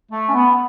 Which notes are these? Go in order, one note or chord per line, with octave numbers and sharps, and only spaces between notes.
A3
C#4
B3